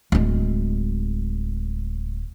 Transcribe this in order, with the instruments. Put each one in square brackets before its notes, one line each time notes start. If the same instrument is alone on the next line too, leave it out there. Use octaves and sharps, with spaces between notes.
[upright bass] D1 G#3